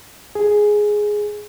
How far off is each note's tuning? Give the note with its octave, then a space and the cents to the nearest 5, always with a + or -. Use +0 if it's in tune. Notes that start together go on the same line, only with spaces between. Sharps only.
G#4 +5